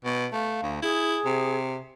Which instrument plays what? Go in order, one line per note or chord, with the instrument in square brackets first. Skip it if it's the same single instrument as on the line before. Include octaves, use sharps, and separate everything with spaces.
[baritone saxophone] B2
[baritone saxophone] A3 [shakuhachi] F5
[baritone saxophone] D2
[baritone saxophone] E4 [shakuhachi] G#4
[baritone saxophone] C3